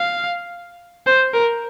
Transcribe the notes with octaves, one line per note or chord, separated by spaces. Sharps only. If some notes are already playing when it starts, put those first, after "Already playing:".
Already playing: F5
C5
A#4